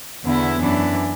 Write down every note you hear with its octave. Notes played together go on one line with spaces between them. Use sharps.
E2 D3 B3 E4
F#2 E3 D4